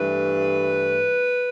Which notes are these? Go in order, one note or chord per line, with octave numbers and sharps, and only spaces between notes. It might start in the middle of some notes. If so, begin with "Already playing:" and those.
Already playing: G2 E3 A3 B4